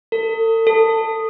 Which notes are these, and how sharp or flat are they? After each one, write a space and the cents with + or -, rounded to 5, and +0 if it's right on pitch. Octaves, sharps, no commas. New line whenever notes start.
A4 +40
A4 +20